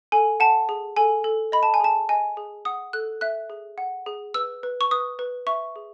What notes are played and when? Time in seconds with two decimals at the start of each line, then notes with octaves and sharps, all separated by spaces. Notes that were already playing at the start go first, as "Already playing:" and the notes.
0.12 A4 G#5
0.40 F#5 A5
0.69 G#4
0.96 A4 G#5
1.24 A4
1.52 D#5 B5
1.63 A5
1.74 G#5
1.80 G#4 A5
2.09 D#5 G#5
2.37 G#4
2.65 F#5 D#6
2.93 A4 F#6
3.21 E5 F#6
3.50 G#4
3.78 F#5
4.06 G#4
4.34 B4 E6
4.63 B4
4.81 C#6
4.91 B4 D#6
5.19 B4
5.47 E5 C#6
5.76 G#4